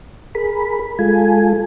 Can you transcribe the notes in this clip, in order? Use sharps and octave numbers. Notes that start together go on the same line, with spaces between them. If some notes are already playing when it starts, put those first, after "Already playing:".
G#4 A#4 B5
G#3 F4 A4 G#5